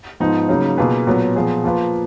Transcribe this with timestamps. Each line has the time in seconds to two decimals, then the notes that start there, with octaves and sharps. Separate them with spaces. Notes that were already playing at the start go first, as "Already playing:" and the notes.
0.20 G#2 F3 B3 D#4
0.49 C#3 F#3 A#3 D#4
0.78 B2 A#3 F4 G#4 B4
1.07 A#2 F#3 B3
1.35 A#2 F3 B3 F4 G#4
1.64 F3 A#3 F4 B4